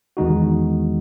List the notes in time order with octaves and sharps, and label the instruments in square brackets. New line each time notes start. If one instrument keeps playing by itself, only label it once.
[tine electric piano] E2 D#3 G#3 D#4 F#4